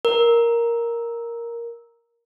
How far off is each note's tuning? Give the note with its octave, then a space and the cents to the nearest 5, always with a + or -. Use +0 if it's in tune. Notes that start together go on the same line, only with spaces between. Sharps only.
A#4 +5